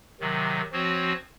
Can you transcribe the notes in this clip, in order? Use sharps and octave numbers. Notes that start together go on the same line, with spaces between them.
C3 D#3 F#3
F3 C4 F#4 C#5